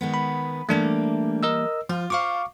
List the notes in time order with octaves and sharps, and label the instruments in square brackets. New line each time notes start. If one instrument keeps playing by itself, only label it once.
[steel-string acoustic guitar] D#3 G#3 B3
[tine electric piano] B5
[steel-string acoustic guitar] E3 G3 A#3 [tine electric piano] A3 D4
[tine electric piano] A#4 D#5 E6
[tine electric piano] F3 [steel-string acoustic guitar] F4
[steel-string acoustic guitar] F4 C5 [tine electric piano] F5 C#6 D6